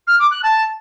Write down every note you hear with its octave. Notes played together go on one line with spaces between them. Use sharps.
F6
D6
F#6
A5